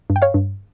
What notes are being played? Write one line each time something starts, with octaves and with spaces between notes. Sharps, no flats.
G2
G5
C#5 F5
G2